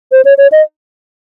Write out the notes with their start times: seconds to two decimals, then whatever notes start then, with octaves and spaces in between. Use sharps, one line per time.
0.12 C5
0.25 C#5
0.38 C#5
0.52 D#5